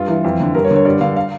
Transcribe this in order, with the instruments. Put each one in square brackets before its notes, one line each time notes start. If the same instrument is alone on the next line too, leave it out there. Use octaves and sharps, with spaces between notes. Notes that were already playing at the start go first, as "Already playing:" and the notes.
Already playing: [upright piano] G2 F4
E3
F2
D3
G2 A#4
C#5
D3
C#5
G2 D5
D3 F5
F5